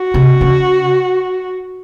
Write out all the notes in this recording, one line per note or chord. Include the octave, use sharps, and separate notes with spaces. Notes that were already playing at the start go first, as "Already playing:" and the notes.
Already playing: F#4
C3
C#3